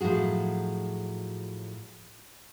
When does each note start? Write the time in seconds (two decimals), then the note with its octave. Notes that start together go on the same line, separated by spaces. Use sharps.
0.01 A2 F3 F#3 F#4 G#4